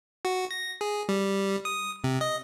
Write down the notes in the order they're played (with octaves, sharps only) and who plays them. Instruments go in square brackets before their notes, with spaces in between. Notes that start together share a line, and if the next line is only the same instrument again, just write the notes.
[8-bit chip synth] F#4
A#6
G#4
G3
D#6
C3
D#5